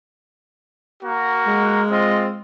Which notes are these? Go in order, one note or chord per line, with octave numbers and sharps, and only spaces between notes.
A#3 F#4
G#3
C4 F4 D#5